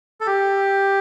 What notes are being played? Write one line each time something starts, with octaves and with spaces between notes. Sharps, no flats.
A4
G4